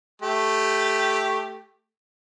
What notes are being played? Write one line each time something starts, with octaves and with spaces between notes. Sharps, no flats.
A3 G4